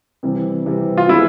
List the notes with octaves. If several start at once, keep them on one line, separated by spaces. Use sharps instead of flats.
C3 E3 G3 C4
C3 E3 G3 C4
F4
C3 E3 G#3 B3 E4